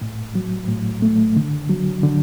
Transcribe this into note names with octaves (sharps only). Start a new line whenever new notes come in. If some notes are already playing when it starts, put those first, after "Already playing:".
A2
F#3
A2
A3
D3
F#3
D3